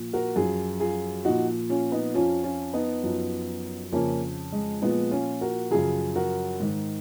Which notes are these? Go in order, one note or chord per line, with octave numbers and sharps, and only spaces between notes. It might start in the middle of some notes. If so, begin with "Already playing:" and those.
Already playing: A#2 F3
F#4 A#4
F#2 F3 F4 G#4
F4 G#4
A#2 F3 D#4 F#4
C#4 F4
B3 D#4
F2 F3 C#4 F4
C#4 F4
B3 D#4
F#2 F3
F2 C#3 F3 A#3 C#4
G#3
A#2 F3 G#3 B3
C#4 F4
F#4 A#4
F#2 C#3 F3 F4 G#4
F#4 A#4
G#2 D#3